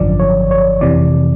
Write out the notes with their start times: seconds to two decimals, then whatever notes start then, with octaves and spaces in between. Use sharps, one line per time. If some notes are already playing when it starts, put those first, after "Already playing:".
Already playing: G#1 F#2 D3 F3 D5
0.20 C#5
0.51 C#5
0.81 F2 C3 E3 D5